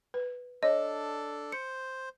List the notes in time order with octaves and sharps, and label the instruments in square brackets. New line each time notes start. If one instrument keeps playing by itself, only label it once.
[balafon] B4
[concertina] D4 A4 [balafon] C#5 [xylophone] D#5
[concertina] C5 [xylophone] C#7